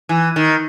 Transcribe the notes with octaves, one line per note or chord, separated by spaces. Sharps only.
E3
D#3